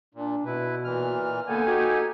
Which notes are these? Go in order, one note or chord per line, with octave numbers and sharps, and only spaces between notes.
A#2 D4
B2 E4 B4
A#2 E3 F6
B2 D3 A#3 B3 A4 G5 G#5
D#4 F#4 G4